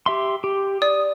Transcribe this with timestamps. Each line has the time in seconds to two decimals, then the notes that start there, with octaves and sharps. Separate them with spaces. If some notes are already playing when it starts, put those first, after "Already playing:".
0.06 G4 E5 C6
0.44 G4
0.82 D5 D#6